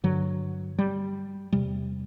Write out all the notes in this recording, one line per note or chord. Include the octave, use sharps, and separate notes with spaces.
G2 D3 F#3
G3
E2 C3 G3